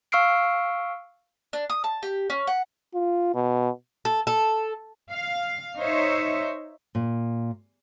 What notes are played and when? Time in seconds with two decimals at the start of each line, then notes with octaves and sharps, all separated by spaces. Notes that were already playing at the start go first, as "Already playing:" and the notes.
0.12 F5 C#6 E6 F6 C7 D7
1.53 D4
1.70 D#6
1.84 A5
2.03 G4
2.30 C#4
2.47 F#5
2.94 F4
3.34 B2
4.05 A4
4.27 A4
5.12 F5
5.79 D#4 C5 C#5 E5
6.95 A#2